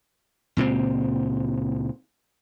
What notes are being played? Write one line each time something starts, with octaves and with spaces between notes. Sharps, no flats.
C#2 A#2 G#3 C4